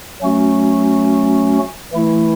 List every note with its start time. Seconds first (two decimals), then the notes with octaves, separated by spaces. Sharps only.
0.21 F#3 A3 C#4 F#4
1.93 E3 A3 E4